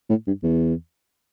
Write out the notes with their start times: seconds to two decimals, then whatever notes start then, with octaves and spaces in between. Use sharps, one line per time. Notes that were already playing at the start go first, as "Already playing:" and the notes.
0.09 A2
0.27 G2
0.43 E2